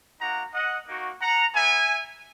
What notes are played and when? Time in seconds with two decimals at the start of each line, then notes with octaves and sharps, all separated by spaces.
0.20 A#3 D#4 F#4 F#5 A#5
0.54 D#5 F#5
0.87 A#3 D#4 F#4
1.21 F#5 A#5
1.54 B3 F#4 E5 G#5